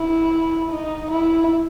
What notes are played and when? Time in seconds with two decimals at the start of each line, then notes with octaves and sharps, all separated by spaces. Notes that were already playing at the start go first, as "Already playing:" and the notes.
Already playing: E4
0.71 D#4
1.11 E4